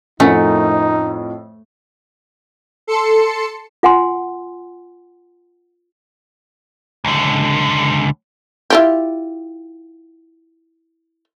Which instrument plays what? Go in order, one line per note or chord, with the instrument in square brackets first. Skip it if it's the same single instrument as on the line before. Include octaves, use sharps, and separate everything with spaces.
[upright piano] F2 A2 F3 [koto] A3 [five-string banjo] C#4 A#4 F#5 [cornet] D#4
[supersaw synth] A4 C6 C#7
[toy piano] F4 F#5 G#5 C6
[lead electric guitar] C#2 D3
[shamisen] E4 F4 G4